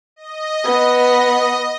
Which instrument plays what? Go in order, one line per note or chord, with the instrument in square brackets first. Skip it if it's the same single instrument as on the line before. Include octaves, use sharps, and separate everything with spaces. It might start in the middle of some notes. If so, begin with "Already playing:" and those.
[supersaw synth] D#5
[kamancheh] B3